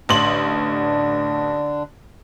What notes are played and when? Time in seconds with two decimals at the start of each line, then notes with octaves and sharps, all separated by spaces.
0.09 A1 D3 D4 C6 F#7